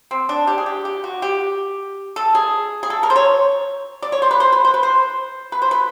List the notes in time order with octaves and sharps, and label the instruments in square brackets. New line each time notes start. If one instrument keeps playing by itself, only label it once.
[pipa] C4
D4
G4
G#4
G4
G4
F#4
G4
A4
G#4
G#4
A4
A#4
C5
C#5
D5
C#5
C5
B4
C5
B4
C5
B4
C5
B4
C5
B4